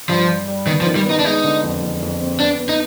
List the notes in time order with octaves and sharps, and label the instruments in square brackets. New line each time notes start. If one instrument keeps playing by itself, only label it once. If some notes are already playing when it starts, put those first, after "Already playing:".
[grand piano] G2 [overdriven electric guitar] F3
[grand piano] G3
G3
[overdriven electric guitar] D#3 [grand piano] B3
[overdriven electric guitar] F3
[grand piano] D#3
[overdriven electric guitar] G3
[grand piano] B3 [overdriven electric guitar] D#4
[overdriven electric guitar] D4
[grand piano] G#3 [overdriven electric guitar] D#4
[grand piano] D3
F2
F2
F2
C4
[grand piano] B3 [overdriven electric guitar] D4
[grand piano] B3
[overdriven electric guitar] D#4